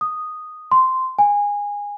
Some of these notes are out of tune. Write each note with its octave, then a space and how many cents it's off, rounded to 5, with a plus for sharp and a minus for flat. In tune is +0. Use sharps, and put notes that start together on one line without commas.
D#6 -5
C6 -10
G#5 -20